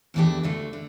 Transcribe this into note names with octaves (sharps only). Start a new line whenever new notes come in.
E2 E3 A3 D4 G4
D2 D3 A3
D3